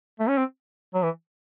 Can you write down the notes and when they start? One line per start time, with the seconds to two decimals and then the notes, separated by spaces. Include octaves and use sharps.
0.19 A3
0.28 C#4
0.37 C4
0.94 F#3
1.03 E3